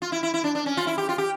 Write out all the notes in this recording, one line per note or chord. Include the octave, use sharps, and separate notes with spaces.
F4
E4
E4
E4
D4
D4
C#4
F4
E4
G4
F4
G4